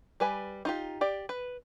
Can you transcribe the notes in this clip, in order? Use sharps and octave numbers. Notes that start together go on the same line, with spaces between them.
G3 B4 G#5
D#4 F4 G4
G4 D5
B4